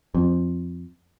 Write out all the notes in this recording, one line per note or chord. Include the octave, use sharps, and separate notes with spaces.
F2